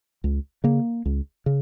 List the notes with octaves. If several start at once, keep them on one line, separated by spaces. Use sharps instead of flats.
C#2
C#3 A#3
C#2
C#3